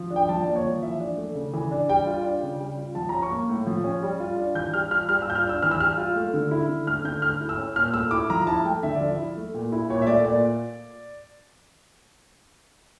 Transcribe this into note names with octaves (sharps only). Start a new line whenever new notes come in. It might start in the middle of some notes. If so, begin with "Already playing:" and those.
Already playing: F3
D4
G5
F3 A5
D5
A#3
C#5
F3
E3 E5
D4
A3
C#3
E3
D4
G3 G5
F4
D4
C#3
G3
F4
F3 A5
C#4 A#5
C#6
A#3
A2
F3
C#4
G3
F4
D4
E3 G6
G3 F6
F4 F6
G3 F6
E6
F4 G6
F6
D4 E6
E3 F6
E6
G3 F6
F4
A3
D3
E4
D3
A3 F6
D3 G6
A3 F6
E4
E6
C#4
A#2 F6
A3 E6
E4 D6
F3 A#5
E4 A5
A3 G5
D3 E5
D5
F3
E5
E4
A3
A#2
E4
A#2 C#5
E5
A3 D5
A#2 D5